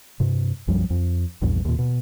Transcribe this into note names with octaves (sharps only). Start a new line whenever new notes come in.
G2 C3
B1 F#2 F3 G3
F2
A#1 E2 G2 A#2
D#2 A#2
B2